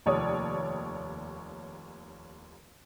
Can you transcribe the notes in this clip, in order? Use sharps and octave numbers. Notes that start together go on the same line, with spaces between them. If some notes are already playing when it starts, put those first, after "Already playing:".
F1 D#2 C#5 D5 D#6